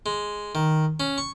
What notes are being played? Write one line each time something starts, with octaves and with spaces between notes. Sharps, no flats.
G#3
D#3
C#4
C#6